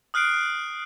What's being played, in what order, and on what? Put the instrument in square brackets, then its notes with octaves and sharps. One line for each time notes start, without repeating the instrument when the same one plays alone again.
[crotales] D#6 F6 F#6 C7 D7